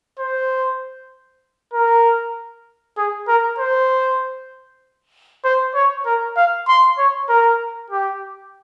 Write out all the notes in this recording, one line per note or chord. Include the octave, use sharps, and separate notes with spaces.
C5
A#4
G#4
A#4
C5
C5
C#5
A#4
F5
C6
C#5
A#4
G4